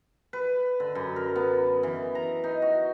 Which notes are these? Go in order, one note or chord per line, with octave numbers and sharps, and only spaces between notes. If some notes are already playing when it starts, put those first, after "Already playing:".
B4
D3
F#2
A#4
B3
E3
A#5
D#4
F#4